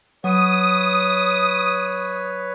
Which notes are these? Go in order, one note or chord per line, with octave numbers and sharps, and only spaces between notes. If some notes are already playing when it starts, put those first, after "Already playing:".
F#3 B4 C#5 D#6